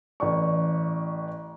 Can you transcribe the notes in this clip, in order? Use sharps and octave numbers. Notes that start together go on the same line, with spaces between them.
A1 D5 C#6